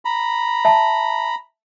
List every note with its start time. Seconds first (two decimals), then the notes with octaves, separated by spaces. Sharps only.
0.05 A#5 B5
0.65 E5 A5